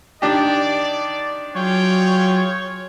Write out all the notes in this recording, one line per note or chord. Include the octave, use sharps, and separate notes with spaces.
D#3 D4 G4 D5
F#3 F4 G#4 C#5 G5